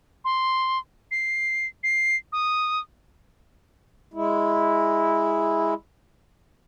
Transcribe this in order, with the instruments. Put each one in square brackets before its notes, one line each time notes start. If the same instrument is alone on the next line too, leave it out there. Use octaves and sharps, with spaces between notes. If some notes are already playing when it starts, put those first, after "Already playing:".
[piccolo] C6
C7
C7
D#6
[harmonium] G#3 E4